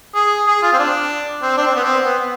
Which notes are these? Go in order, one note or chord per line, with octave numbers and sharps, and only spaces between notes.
G#4
G#4
F4
C4
D4
C4
D4
C4
B3
C4
B3